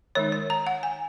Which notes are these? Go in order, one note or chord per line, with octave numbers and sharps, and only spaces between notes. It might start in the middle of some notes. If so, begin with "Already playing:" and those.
D#3 G#3 D#4 C#5
C#5
A#5
F#5
G#5